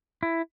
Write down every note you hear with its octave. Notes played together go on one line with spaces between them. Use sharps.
E4